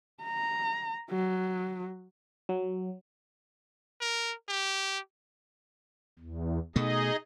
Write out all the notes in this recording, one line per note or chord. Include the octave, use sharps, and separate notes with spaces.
A#5
F#3
F#3
A#4
G4
E2
B2 A3 D#4 G#4 D#5